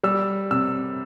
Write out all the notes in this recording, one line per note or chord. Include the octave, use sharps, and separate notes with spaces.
G3 E6
C3 E6